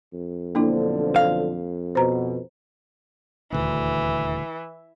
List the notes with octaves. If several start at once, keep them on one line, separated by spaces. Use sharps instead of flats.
F2
B1 D3 F3 A#3 D4 E4
F5
B2 C5 A#5
D#1 D2 E3